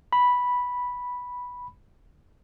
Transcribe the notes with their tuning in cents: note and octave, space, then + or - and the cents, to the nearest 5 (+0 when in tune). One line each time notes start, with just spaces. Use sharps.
B5 -5